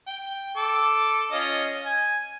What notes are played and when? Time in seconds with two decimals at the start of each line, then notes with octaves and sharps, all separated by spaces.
0.07 G5
0.57 A4 D6
1.32 C#4 F4 D#5
1.85 G#5